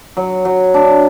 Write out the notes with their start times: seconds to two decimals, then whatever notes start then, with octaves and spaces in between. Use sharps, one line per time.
0.17 F#3
0.45 F#3
0.74 D4